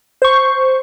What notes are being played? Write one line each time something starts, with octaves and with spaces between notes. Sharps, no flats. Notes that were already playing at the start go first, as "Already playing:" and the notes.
C5 C#6